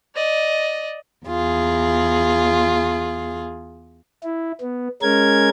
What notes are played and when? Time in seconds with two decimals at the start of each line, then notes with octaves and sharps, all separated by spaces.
0.15 D5 D#5
1.25 E2 F4 G#4
4.23 E4
4.61 B3
5.02 G#3 C#4 A#4 G#6